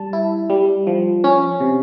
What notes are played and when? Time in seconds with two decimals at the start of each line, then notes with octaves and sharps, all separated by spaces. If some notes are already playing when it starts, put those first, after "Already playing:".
Already playing: G3 A5
0.13 E4
0.50 G3
0.87 F3
1.24 C#4
1.60 C3